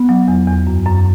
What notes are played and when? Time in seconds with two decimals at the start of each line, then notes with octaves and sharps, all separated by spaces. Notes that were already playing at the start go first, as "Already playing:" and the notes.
Already playing: B3
0.09 F#3
0.28 E2
0.48 E2
0.67 F#2
0.86 F#2